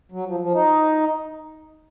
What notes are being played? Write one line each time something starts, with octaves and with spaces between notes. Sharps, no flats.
F#3
F3
F3
D#4